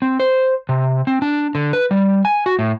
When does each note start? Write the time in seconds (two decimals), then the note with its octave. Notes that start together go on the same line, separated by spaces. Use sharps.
0.02 C4
0.20 C5
0.69 C3
1.07 C4
1.22 D4
1.55 D3
1.73 B4
1.91 G3
2.25 G#5
2.46 F#4
2.59 A2